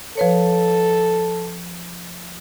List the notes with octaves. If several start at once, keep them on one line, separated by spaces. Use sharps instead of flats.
F3 A4 B4 C#5